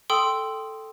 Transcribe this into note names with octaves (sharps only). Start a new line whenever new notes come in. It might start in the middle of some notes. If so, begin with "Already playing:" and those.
A4 G5 C6 D#6 E6